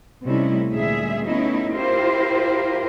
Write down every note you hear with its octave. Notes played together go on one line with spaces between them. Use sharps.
C3 G3 A3 C#4 D#4 E4
D2 A#2 G3 G#3 G#4 E5
A3 B3 C#4 D#4 E4
E4 F4 G4 A#4 C5